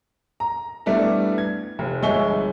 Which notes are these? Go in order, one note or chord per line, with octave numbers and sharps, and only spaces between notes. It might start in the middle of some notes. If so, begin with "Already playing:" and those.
A#5
G3 A3 B3 D4 E4
G#6
F1
G1 G#3 E5 G#5 C#6 G7